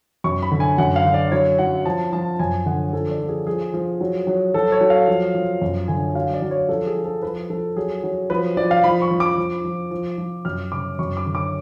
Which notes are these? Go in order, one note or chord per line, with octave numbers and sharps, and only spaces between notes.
F#2 C#6
B5
D3
G#5
F#2 F#5
F5
D3
D5
F#3 C#5
F#3 F#5
F3 A5
F3 A5
F#2 G#5
D3 F#5
F3 A4
D5
F3
G#4
F3 G#4
F3
F#3
F#3
F#3 A4
C#5
F#3
F5
F3
F3
F#2
D3 G#5
F#3 F5
D5
F#3
C#5
F3 A4
G#4
F3
A4
F3 B4
F3 A4
F#3 G#4
F#3
F3 B4
F3 D5
F5
F3 B5
C#6
F3
D6
F3
F3
F3
F3
F#2 F6
C#3 D6
F#2 C#6
D6
D3
D6